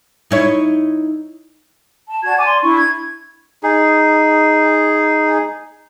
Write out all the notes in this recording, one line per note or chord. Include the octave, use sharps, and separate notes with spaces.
D#4 E4 C#5
A5
F#4 D5 A5 G#6
D5 G#5 D6
C6
D4 E4 C#6
G#6
D#4 G#4